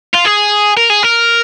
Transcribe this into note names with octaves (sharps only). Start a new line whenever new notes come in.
F4
G#4
A#4
G#4
A#4